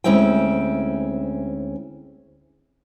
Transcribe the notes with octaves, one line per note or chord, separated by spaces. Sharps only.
D2 G#3 C4 C#4 E4 G5